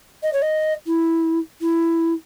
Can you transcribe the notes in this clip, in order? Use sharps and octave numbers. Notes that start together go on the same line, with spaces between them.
D#5
C#5
D#5
E4
E4